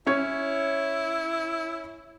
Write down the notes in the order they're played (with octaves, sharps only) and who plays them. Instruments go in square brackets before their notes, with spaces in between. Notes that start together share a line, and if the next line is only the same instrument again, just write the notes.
[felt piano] C#4 C#5 [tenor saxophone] E4